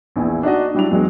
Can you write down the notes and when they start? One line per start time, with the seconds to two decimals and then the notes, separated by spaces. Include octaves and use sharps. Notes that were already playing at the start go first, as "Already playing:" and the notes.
0.16 A#1 E2 E4 G#5
0.43 D4 D#4 F#4 D#5
0.74 F#3 G3 D4 E4 D5 F7
0.91 E2 F#3 G#3